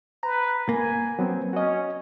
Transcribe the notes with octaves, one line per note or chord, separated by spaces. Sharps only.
B4 A#5
A#3 G#5
F#3 B3 C4
C#4 F#4 D#5